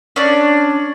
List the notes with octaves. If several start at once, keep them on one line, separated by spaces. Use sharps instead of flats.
C#4 D4